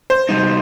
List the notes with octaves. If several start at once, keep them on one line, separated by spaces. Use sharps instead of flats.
C5
C3 G3 D#4